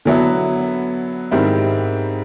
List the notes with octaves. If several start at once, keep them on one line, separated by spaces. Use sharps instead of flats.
D3 F#3 B3 E4
G#2 D#3 G3 C4 E4